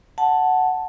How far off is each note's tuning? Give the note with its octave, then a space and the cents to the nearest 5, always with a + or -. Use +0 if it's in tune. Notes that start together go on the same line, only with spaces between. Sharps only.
F#5 +0 A5 +0